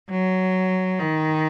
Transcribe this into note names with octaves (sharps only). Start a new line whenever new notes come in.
F#3
D#3